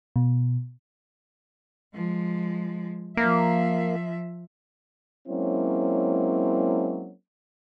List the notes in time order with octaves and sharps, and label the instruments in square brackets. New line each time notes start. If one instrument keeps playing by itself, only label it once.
[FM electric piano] B2
[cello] F3 G#3
[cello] F3 E5 [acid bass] A#3
[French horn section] F#3 G#3 A#3 C4 C#4 E4